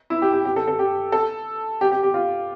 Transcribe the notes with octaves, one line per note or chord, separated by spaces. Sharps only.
E4
G4
G4
G4
A4
A4
G4
A4
G4
G4
G4
F4